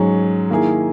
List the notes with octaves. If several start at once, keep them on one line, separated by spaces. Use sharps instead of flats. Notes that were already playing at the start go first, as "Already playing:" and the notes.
Already playing: G#2 F#3 C#4 G#4
D#3 A#3 E4 G#4